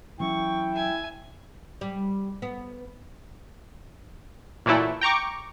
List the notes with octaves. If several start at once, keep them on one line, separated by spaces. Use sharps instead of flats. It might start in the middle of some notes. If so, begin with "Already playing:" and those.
E3 F#3 C#4 E4 G5 C#6
E5 G#5
G3
B3
A#2 E3 F#3 A3 E4
G5 A#5 C#6 D6